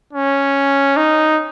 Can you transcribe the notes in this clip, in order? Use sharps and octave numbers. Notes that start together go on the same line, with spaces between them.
C#4
D#4